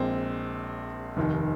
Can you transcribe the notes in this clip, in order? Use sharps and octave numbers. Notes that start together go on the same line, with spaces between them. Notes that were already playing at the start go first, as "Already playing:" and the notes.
Already playing: A#1 A#2 G#3 C4
F1 D#2 D#3